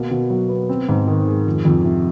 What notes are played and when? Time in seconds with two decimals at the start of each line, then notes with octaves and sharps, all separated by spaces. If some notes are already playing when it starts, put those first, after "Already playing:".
Already playing: B2 A#3
0.11 B2
0.30 F#3
0.49 B3
0.69 C4
0.89 G#2
1.07 D#3
1.27 G#3
1.47 F2
1.65 F2
1.84 C3